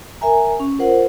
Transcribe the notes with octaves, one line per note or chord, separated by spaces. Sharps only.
A#4 E5 G#5 A#5
C#4
F4 A#4 C5 F#5